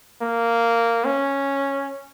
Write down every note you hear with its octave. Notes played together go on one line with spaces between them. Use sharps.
A#3
C#4